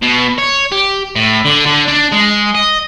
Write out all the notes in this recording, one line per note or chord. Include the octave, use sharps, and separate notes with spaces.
B2
C#5
G4
A2
D3
D3
D4
G#3
D#5